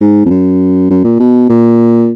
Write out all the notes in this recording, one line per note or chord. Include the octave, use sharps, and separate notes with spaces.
G#2
F2
F#2
F#2
A#2
B2
A#2